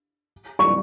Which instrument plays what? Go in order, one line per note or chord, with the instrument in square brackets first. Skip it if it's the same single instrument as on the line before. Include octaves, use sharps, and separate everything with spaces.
[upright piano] C#6